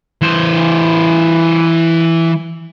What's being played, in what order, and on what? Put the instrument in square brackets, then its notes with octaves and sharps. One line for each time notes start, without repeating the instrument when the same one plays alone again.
[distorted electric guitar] E3 C5